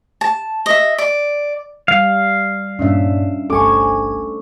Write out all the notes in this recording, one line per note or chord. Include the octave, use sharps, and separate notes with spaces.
A5
D#5 E5
D5
G3 F5
G2 A#2 C#4 D4 E5
G1 C2 A3 C4 A4 G#5 C#6 D6